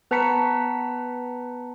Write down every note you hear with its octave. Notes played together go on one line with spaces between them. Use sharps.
B3 B4 A5 A#5 B6 C#7